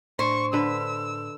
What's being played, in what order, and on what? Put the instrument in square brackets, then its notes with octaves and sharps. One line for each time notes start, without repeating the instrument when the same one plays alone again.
[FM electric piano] A2 D4 [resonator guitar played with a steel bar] C5 [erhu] C#6
[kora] D3 B4 [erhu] E6